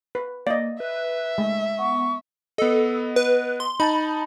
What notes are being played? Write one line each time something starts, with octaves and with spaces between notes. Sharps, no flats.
B4
A#3 D5 D#5
B4 E5
G#3 A3
B3 C#6
B3 A4 D#5
B4
C6
D#4 A5 B5 A6